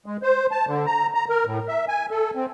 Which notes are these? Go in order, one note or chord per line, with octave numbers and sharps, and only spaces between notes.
G#3
C5
A5
D3
A#5
A#5
A#4
A2
E5
G#5
A4
C4